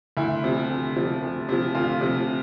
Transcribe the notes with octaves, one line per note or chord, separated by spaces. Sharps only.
D2 E4
C3 F3
D2
C3 F3
D2
C3 F3
D2 F4
C3 F3